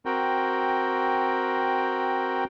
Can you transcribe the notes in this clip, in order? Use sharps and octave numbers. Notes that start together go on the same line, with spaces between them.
C4 F#4 A#4 G5